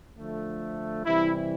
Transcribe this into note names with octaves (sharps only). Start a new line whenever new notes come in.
D3 F3 A3
C3 E3 G3 E4